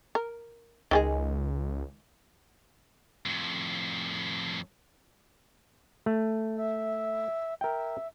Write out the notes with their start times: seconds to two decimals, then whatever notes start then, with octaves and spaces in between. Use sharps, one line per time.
0.15 A#4
0.91 C#2 D#3 G#3 G#4
3.26 F2 A2
6.06 A3
6.56 E5
7.61 A#4 E5 G5